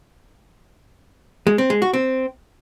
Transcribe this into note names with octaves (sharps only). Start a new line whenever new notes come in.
G#3
C4
G#3
F#4
C4